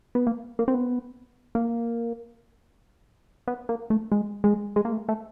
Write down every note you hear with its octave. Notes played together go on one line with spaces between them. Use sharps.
B3
A#3
A#3
C4
B3
A#3
B3
A#3
A3
G#3
G#3
G#3
A#3
A3
A3